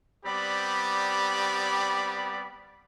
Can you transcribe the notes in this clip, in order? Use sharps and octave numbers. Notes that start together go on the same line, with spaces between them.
G3 B3 C4 G4 D5 B5